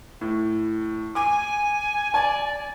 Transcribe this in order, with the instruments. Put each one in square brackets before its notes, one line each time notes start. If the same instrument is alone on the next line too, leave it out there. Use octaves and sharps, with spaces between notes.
[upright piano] A2
[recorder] G#5 [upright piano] D6
[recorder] D5 [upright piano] G#5